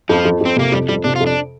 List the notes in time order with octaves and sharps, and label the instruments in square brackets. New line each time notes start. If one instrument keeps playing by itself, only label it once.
[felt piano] F2 [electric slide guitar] F3
[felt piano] F2
[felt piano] F2 [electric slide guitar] C4
[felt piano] C3 [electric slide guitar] A#3
[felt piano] F2 [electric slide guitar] G3
[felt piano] F2 [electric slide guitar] G3
[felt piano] C3 [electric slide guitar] D4
[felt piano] F2 [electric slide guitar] F4
[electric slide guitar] D4